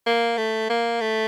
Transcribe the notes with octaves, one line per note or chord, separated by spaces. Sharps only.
A#3
A3
A#3
A3